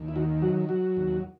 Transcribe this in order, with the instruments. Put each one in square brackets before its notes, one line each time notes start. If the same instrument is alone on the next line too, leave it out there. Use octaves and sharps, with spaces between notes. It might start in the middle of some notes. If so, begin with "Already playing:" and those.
Already playing: [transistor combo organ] D#2
E4
D#3 F#4
F#3 F#4
F#3 F#4
D#2